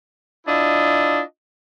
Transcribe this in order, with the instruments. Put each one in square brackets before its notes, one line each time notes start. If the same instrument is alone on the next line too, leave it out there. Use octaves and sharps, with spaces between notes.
[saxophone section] D4 E4 F4 D#5